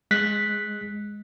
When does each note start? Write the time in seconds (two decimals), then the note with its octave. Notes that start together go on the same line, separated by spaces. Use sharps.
0.11 G#3 F#6 B6